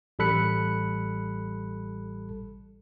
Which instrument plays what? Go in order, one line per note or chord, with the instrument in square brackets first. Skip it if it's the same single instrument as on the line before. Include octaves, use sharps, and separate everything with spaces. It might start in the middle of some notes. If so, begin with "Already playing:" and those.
[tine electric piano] A1 G3 A4 B5 F#6 C#7